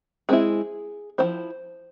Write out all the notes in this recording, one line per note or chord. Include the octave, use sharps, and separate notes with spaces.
G#3 C4 E4 G#4
F3 C4 E4 C5